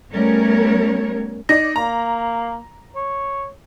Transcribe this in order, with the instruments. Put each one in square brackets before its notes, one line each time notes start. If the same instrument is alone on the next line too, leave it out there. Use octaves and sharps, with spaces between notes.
[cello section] G3 A3 B3 C#4 A#4 C#5
[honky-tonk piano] D#4 D5 [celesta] A#6
[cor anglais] A#3 [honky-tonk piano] A#5
[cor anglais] C#5